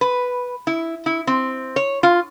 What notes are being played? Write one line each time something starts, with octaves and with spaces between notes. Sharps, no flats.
B4
E4
E4
C4
C#5
F4